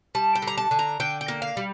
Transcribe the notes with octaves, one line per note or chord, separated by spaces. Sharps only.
G3 A5
G5
D3
A#5
A5
D3
A#5
D3 G5
G5
A#3
F5
G3